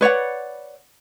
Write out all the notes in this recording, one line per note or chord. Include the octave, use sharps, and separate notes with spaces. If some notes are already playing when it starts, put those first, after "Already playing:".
B4 C#5 D5 F#5